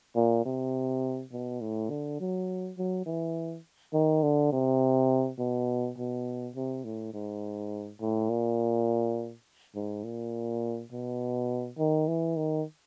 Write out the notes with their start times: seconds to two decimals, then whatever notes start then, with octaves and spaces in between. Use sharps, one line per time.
0.16 A#2
0.45 C3
1.32 B2
1.61 A2
1.90 D3
2.20 F#3
2.78 F#3
3.06 E3
3.94 D#3
4.23 D3
4.52 C3
5.39 B2
5.98 B2
6.55 C3
6.85 A2
7.13 G#2
8.01 A2
8.30 A#2
9.76 G#2
10.04 A#2
10.92 B2
11.78 D#3
12.08 E3
12.37 D#3